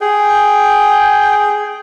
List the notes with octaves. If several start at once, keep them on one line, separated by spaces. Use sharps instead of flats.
G#4 G5